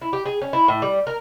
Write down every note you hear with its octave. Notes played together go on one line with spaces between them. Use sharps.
E4
G4
G#4
C#4
E4
A2
G3
A#4